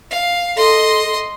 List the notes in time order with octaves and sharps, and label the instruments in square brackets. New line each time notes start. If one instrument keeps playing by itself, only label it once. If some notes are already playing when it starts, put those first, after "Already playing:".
[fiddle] F5
[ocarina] A4 [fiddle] D#5 C6